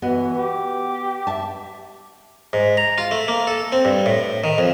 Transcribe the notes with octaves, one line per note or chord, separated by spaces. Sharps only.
E3 B3 F#4 D#5
G4
E5 A5
G#2
A#5
F4
A3
A#3
A4
C4
G2
A2
D#3
F2